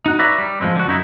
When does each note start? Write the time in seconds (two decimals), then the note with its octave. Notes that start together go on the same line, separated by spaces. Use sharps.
0.06 D#4 F#4
0.19 B4 C#5 D5 E5 A#5 B5
0.38 G3
0.61 F3 F#3 G#3 C4
0.75 D3 F#4
0.87 F#2 D#4 E4